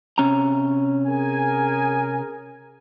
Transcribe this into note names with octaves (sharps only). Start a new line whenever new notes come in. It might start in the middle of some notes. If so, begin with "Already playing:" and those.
C3 C#4 A#5
G#4 A#4 G#5